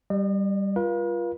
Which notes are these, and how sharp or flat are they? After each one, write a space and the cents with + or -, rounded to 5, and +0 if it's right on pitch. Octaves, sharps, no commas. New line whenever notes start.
G3 +0 D#5 -45
F4 -10 B4 -45 F5 +0